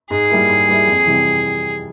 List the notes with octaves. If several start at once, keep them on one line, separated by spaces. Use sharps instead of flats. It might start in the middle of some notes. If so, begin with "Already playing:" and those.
G#2 G#4
G3 A#3 E4
G#2
G3 A#3 E4
F2
C3 E3 G3